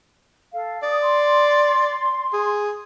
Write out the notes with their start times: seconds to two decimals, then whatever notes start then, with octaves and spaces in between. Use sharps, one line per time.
0.53 A4 F5
0.83 D5 D#6
1.01 C6
2.33 G#4